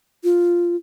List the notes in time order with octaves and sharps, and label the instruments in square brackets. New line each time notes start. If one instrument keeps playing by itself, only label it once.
[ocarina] F4